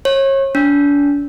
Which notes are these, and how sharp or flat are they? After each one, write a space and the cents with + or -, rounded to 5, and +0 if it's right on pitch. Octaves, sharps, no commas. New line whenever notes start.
C#5 -35
D4 -40